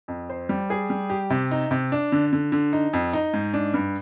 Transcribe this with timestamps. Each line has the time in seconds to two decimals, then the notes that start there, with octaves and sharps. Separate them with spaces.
0.08 F2
0.30 C5
0.49 G3
0.70 G#4
0.90 G3
1.10 G4
1.30 C3
1.51 D#4
1.71 C3
1.92 D4
2.12 D3
2.33 D3
2.52 D3
2.73 D#4
2.93 F2
3.13 D#4
3.33 G#2
3.54 D4
3.74 G2